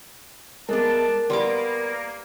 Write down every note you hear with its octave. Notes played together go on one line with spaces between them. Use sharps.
G#3 B3 D4 A#4 A5
G3 A#3 B3 C6 D6